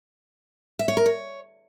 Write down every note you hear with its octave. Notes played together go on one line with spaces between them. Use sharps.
E5
C#5
A#4
C#5